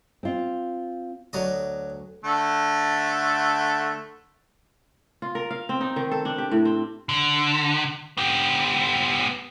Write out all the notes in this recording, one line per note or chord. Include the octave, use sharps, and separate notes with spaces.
C4 F4
D2 F#3 D5 D#5
D3 A3
F4
A#4
F5
C4
D#4
D#3
A4
D4
G4
A2
C4
D3
B3 G4